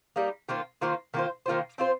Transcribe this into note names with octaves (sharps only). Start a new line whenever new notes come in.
G3 A#3 D#4
D#3 A#3 F4 C5
D#3 A#3 F4 C5
D#3 A#3 F4 C5
D#3 A#3 F4 C5
C4 F4 C5